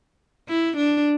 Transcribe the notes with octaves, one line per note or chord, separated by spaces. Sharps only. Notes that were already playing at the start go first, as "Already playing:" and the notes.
E4
D4